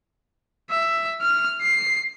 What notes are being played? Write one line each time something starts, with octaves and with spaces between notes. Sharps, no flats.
E5
F6
C7